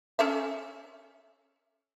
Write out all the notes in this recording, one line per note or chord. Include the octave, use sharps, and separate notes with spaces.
C#4 A4 E5